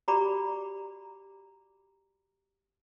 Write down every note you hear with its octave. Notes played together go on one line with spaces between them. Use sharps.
F#4 G4 D5 A#5 B5 D6